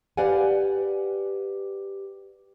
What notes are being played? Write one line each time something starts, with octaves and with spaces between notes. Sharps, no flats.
G4 B4 D5 F5 F#5 G#5